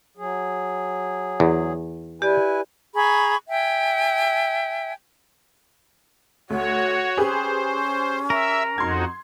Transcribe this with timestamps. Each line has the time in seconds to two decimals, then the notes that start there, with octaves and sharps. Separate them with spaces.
0.17 F#3 G#4
1.40 E2
2.22 E4 G4 B4 D5 G#5
2.95 G#4 A#5 B5 C#6
3.48 E5 G5 G#5
6.50 D2 F#4 C#5 F#5
7.17 C#4 G4 G#4 B4 C5
8.30 A#4 E5
8.78 F2 D#4 F#4 C6 G#6